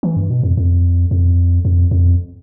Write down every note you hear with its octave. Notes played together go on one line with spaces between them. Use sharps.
E3
G2
B2
F2
F2
F2
F2
F2